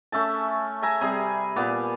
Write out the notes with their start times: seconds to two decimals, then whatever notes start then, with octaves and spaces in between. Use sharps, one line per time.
0.12 A3 C#4 E5 A5
0.82 E5 G#5 A#5
1.01 C3 G3 G#4 A#5
1.56 A#2 B3 D6